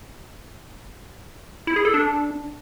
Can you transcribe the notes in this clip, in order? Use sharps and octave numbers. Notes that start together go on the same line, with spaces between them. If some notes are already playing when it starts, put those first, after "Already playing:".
E4
G#4
A4
D4